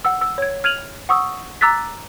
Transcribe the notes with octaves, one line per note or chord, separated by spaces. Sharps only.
F#5 E6
E6
C#5 G#6
F6 G#6 D#7 F7 F#7
F#5 C#6 D#6 E6
A#5 D6 E6 F#6 A6 B6